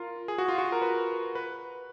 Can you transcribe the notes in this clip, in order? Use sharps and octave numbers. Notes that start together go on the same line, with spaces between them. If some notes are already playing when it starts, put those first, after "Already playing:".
Already playing: F4 A#4
G#4
F#4
F4
F#4
A#4
B4
B4